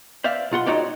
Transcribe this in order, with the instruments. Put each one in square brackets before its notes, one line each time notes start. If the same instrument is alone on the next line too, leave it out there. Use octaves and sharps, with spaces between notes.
[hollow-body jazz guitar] C5 D5 E5 F5
B1 F4 F#5 C6
G#3 D#4 F#4 G4 C#5 D5